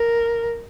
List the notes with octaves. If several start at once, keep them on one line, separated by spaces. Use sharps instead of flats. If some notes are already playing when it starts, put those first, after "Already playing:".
Already playing: A#4